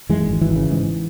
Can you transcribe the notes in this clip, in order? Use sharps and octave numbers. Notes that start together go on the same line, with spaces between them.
F#2 E3 G#3
G#1
G#1 E3
C#3
G#2